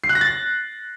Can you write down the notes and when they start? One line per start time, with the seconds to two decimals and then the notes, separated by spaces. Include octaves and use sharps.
0.04 C7
0.09 F#6
0.15 A#6
0.21 A6